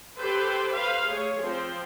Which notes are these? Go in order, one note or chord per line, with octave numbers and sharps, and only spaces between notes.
G4 A4 B4 C5
B4 C5 F5
A3 G#4 C#5
F3 C4 C5